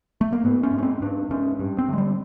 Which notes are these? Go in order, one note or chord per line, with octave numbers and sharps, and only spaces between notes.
A3
A#3
G#2 B3
C#4
G#2
C#4
C4
G#2 D4
G#2 C#4
G2
C4
D3 G#3
G3